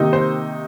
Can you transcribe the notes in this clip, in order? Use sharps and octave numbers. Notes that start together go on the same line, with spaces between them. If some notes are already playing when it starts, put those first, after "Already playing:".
Already playing: C3 D#3 A#3 D#4
C5